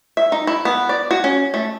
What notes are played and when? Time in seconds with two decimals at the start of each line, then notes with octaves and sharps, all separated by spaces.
0.17 E5
0.32 D#4
0.47 E4
0.65 B3
0.89 D5
1.11 F#4
1.24 C#4
1.54 A3